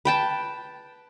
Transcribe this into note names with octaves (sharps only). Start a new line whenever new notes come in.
B4 G5 A5